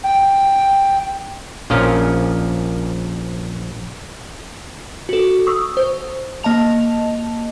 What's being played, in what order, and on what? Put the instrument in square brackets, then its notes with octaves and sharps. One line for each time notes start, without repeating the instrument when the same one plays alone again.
[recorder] G5
[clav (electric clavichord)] A#1 F3 C#4 F4 A#4
[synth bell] F#4 A4
C#6 D#6 E6
C5
A#3 D#5 A5 F7